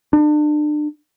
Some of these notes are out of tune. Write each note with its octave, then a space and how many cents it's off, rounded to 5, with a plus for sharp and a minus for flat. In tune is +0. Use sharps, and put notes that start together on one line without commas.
D4 +35